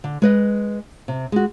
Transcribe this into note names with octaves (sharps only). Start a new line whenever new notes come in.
D3
G#3 B4 D#5
C3
G#3 F#4